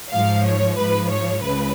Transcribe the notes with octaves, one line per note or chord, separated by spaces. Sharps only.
G#2 F3 F5
C#5
G#2 F3 B4
C#5
C#2 C#3 B4